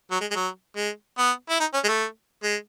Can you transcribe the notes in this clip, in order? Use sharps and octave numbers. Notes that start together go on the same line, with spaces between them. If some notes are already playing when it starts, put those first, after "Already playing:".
F#3
G#3
G#3
F#3
G#3
B3
E4
D#4
C#4
G#3
A3
G#3